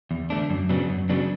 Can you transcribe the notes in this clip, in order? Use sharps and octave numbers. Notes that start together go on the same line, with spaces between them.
E2
D3 A3 D4
F#2
C#3 F#3 B3 D4
F#2
C#3 F#3 B3 D4